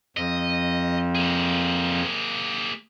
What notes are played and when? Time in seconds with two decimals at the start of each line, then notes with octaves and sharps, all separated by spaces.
0.17 F2 D#5
1.15 A#3 G#4